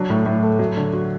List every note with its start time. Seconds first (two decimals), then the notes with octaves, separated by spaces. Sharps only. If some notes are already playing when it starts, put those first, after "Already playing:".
Already playing: F#3 D4
0.10 A2
0.26 A2
0.43 A3
0.59 F#3
0.76 D3
0.93 F#4